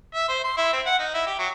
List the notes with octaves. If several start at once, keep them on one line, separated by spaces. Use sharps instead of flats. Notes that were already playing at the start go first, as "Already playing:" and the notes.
E5
C5
C6
E4
C4
F#5
D#4
E4
G4
F#3